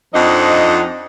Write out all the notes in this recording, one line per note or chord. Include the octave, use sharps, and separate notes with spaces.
F2 F3 D4 D#4 D#5 F#5